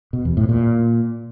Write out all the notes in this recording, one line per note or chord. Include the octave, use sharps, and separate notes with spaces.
B2
E2
A2
A#2